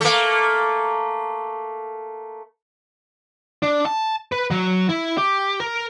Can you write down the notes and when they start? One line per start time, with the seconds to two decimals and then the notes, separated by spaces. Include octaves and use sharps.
0.01 A3 A#3
3.62 D4
3.85 A5
4.32 B4
4.51 F#3
4.89 E4
5.18 G4
5.60 A#4